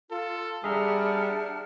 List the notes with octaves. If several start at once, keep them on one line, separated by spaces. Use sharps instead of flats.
F4 A4
G3 D4 G#4 E5 F#5 A#5 F6